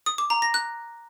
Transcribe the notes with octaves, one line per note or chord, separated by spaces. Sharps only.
D#6
D6
A#5
A#6
F#6